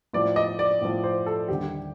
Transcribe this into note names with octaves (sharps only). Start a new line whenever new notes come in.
A2 F3 D5
D#5
D5
A2 F3
C5
A4
D#2 D3 G3 G4